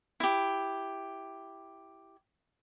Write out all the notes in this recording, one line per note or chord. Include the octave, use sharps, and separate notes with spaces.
E4 G4